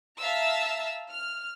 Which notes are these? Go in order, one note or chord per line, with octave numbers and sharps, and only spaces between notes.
E5 F5 A5 A#5 E6
F6